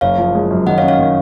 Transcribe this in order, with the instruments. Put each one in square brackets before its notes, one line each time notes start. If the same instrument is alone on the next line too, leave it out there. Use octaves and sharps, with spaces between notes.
[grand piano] F#1 [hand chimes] C#5 F5
[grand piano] F3
G#3
F#2
[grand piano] D#3 [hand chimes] D#5 F#5
[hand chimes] C#5 F5
[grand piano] C#4
[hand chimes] C#5 F5
[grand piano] D#3